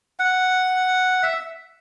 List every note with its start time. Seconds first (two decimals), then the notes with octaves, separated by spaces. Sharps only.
0.19 F#5
1.23 E5